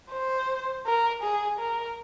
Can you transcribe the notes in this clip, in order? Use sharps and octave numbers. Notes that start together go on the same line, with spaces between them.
C5
A#4
G#4
A#4